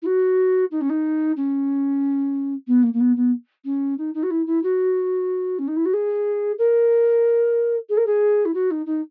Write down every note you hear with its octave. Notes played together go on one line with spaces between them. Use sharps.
E4
F#4
D#4
C#4
D#4
C#4
B3
A#3
A#3
B3
B3
C#4
D#4
D#4
F#4
E4
E4
F#4
C#4
D#4
E4
F#4
G#4
A#4
G#4
A#4
G#4
E4
F#4
D#4
D#4